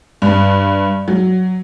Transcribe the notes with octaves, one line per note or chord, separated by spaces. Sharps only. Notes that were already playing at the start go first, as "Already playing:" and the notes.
G2
F#3